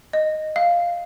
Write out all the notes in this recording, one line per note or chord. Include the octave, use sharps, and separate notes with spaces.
D#5
F5